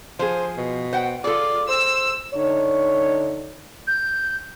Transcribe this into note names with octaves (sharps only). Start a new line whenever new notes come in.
F3 G#4 C5
B2
C5 F#5 G5
F4 G#4 A4 D5
C5 E6
D3 D#4 C#5
G6